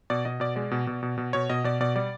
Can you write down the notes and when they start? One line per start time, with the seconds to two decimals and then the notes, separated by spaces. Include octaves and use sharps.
0.10 B2 D5
0.25 B2 D#5
0.40 B2 D5
0.56 G#3 D5
0.71 B2
0.87 B2
1.03 B2
1.18 B2
1.33 B2 C#5
1.50 B2 D#5
1.64 B2 D5
1.80 B2 D5
1.96 G3 D5